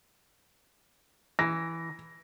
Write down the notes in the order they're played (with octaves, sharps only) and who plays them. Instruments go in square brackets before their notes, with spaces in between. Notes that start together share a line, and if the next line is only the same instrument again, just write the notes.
[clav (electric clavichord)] E3 [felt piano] A#6